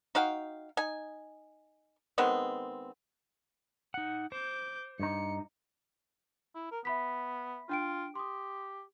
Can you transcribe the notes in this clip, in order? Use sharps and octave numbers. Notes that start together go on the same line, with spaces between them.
D#4 F#4 F5 G5
D#4 G#5
D#3 G#3 B3 C4
D#4 F#5
C5 D6 G6
G2 D#4 C#7
E4
A#4
B3 E5 B5 B6
D4 F4 G5 D7
G4 C6 D#6